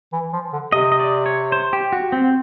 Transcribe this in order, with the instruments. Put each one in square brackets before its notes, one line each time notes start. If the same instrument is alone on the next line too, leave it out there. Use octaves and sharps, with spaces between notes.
[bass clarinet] E3
F3
D3
[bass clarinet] C3 [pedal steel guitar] D#5
[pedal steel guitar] D#5
D5
C#5
C5
G4
F#4
C4